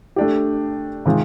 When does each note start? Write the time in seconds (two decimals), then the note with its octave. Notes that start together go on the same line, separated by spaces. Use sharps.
0.16 A3 D4 G4
1.06 C3 D#3 G#3 C4 F4